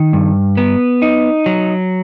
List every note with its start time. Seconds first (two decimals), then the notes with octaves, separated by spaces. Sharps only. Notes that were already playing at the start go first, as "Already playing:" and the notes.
Already playing: D#3
0.13 G2
0.57 B3
1.02 D#4
1.46 F#3